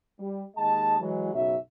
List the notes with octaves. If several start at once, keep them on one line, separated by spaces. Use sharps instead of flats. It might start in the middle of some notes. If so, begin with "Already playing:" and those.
G3
D#2 G#3 D#5 A5
E3 F#3 G#3
B1 F#2 C#3 F#3 E5